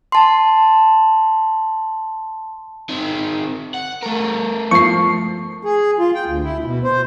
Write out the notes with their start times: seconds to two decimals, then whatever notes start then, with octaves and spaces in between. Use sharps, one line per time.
0.12 A5 C6
2.89 D#3 C4
3.74 F#5
4.03 A3 A#4
4.71 F3 C#6 C7
5.63 G#4
5.99 F4
6.15 G5
6.26 D2
6.44 E4
6.64 B2
6.84 C5